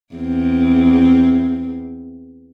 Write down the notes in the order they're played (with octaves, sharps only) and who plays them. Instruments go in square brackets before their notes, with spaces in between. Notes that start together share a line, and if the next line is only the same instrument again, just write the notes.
[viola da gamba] E2 C4